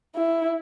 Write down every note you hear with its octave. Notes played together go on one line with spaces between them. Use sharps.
E4